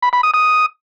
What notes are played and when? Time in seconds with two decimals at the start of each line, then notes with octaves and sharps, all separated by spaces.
0.02 B5
0.13 B5
0.23 D#6
0.34 D#6